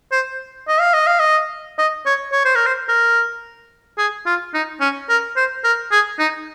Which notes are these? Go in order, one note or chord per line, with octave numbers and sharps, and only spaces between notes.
C5
D#5
F5
D#5
F5
D#5
D#5
C#5
C#5
C5
A#4
C5
A#4
G#4
F4
D#4
C#4
A#4
C5
A#4
G#4
D#4